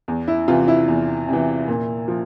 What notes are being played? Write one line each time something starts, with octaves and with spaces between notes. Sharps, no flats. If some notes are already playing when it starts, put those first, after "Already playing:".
E2
E4
C3 E3 F4
E4
E2
C3 E3
A#2
F3